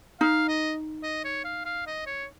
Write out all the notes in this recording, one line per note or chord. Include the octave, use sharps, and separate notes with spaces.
D#4 F5
D#5
D#5
C#5
F5
F5
D#5
C#5